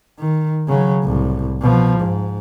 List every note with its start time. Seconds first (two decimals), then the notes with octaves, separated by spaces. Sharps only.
0.20 D#3
0.69 C#3 F#3
1.03 C2 A2
1.62 B2 F3
2.00 G#2